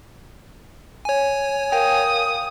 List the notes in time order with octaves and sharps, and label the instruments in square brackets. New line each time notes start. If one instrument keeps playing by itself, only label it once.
[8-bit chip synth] C#5 G#5
[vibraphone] A#4 F5 [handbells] G5 [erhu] D#6